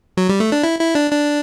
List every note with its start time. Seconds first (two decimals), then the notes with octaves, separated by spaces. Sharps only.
0.17 F#3
0.29 G3
0.40 A3
0.52 D4
0.63 E4
0.79 E4
0.95 D4
1.12 D4